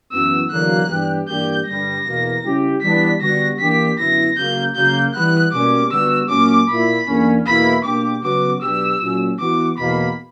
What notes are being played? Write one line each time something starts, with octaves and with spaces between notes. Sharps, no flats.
F#2 E3 B3 F#4 E6
E2 D3 F#3 A#3 F#6
G2 E3 B3 D4 G4
G2 E3 A#3 D4 G4 G6
G2 D3 G3 A#6
E2 B2 A#3
C#3 G3 C#4 E4 G4
E3 G3 B3 D4 B6
D3 G3 B3 F#4 A#6
E3 A#3 D4 G4 B6
F#2 D3 F#3 B3 E4 A#6
C#3 F#3 A#3 G6
C#3 F#3 A#3 G6
E3 G3 B3 F#6
B2 G3 A#3 C#4 D6
D3 G3 B3 F#4 E6
A#2 F#3 A#3 C#4 D6
A#2 A#3 E4 B5
E2 D3 A#3 C#4
E2 B2 A#3 E4 B5
B2 A#3 D4 G4 D6
C#3 F#3 B3 F#4 D6
B2 F#3 B3 D4 G4 E6
A#2 F#3 C#4
E3 B3 F#4 D6
E2 B2 A#3 B5